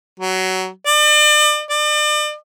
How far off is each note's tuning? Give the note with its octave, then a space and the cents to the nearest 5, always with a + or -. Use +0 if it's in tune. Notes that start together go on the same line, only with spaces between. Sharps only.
F#3 +20
D5 +40
D5 +40